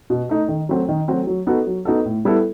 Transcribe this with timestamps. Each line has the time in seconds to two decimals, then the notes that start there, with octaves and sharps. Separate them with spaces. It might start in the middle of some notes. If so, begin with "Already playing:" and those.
0.10 B2
0.29 A3 D#4 A4
0.48 D#3
0.69 F#3 A3 C4 F#4
0.89 D#3
1.08 F#3 A3 C4 F#4
1.27 F#3
1.47 B3 D#4 F#4 A4
1.67 F#3
1.85 B3 D#4 F#4 A4
2.05 A2
2.25 G3 B3 E4 A4